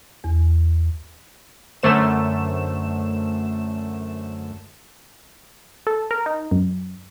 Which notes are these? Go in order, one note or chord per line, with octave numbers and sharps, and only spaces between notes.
E2
F#2 D3 A3 C5 E7
A4
A#4
D#4
F#2